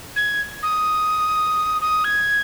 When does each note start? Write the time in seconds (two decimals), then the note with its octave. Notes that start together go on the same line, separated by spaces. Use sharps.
0.16 G#6
0.63 D#6
1.81 D#6
2.04 G#6